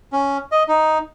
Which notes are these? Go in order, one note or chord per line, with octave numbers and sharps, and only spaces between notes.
C#4
D#5
D#4